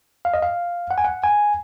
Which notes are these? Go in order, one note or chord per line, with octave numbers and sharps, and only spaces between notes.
F5
D#5
F5
F#5
G#5
F#5
G#5